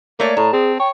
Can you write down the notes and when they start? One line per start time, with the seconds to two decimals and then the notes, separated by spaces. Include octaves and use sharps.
0.20 A3 A#3 C#5 D5
0.37 A2 A5 A#5
0.53 C4 G#4
0.80 C#5 G5